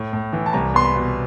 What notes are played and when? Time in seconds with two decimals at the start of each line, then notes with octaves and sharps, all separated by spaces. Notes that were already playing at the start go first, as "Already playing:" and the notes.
Already playing: A2
0.13 A2
0.33 E3
0.46 A5
0.53 C2 A#5
0.74 B3 C6
0.85 B5
0.96 B2